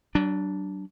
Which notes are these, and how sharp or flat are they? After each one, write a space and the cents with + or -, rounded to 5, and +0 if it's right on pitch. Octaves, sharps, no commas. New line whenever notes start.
F#3 +40 D4 +0